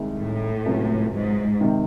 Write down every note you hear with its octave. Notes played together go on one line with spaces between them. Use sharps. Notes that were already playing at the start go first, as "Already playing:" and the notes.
Already playing: C2 C3 D#3 G#3
A2
C#2 C3 F#3 C#4
G#2
C3 D#3